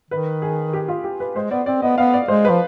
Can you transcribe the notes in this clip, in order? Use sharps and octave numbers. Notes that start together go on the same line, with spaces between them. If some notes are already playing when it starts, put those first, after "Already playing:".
D#3 B4
G#4
G4
F4
G4
B4
G#3 C5
B3 D5
C4 D5
B3 D#5
B3 F5
D5
G#3 C5
F3 B4